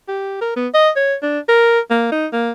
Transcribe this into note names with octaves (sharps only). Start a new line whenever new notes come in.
G4
A#4
B3
D#5
C#5
D4
A#4
A#3
D#4
A#3